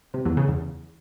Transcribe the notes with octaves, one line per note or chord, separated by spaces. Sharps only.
C3
E2
C#3
E2